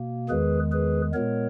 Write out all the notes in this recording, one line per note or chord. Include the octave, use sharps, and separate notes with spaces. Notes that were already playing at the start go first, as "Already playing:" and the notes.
Already playing: B2 A#3
E2 D#3 G#3 G#4 B4
G#4 B4
A#2 G#3 B3 A#4 C#5